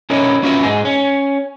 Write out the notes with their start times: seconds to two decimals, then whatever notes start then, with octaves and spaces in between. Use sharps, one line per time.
0.10 C#4 D#4 E4 A#4 C#5 D#5
0.43 D#2 C#4 F4 F#4 B4 E5
0.63 G#2 D#4 G#4
0.85 C#4